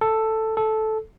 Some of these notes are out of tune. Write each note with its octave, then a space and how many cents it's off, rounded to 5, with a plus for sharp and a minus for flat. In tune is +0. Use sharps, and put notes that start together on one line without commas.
A4 +5
A4 -10